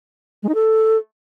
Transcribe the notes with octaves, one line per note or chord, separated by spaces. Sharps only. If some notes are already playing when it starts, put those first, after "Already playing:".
G#3
D#4
A4